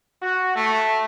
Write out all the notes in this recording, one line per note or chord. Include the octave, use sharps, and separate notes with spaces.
F#4
A3